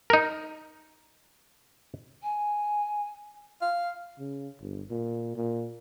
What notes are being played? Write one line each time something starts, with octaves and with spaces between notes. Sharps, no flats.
D#4 A#4
G#5
F5
C#3
G1
A#2
A#2